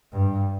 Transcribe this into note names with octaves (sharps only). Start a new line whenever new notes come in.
G2